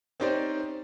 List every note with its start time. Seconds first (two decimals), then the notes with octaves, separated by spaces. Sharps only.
0.20 C4 C#4 D#4 G4 C5 D5